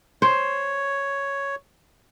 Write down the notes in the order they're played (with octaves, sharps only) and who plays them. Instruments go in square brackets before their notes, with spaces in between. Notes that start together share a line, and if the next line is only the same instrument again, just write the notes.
[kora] C5 [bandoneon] C#5